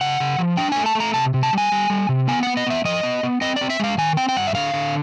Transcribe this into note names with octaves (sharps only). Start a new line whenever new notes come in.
C#3 F#5
C#3
F3
D4 G5
A3 G#5
A5
A3
A#5
C3 A5
C3
A5
G3 G#5
G3
G3
C3
B3 G#5
B3 F#5
D#5
B3 E5
F3 D#5
B3
B3
C4 D#5
C4 D5
E5
G#3 F5
D#3 G#5
C4 G5
G5
G2 F#5
E5
D3 F5
D3